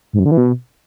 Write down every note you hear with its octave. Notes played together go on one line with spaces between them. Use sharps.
G#2
F#2
D3
E3
B2